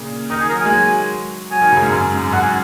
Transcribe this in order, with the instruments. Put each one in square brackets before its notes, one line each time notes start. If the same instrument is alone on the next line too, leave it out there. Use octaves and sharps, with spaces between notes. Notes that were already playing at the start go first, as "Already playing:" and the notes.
Already playing: [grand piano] A#2 C#3
[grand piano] D#3 [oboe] D#4
[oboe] G#4
[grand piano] F#3 [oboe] A#4
[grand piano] G#3 [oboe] G#5
[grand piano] F#3
[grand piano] F#3 [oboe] G#5
[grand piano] D#3
C#3
F#2
G#2
F#2
G#2
[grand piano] F#2 [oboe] F#5
[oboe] G#5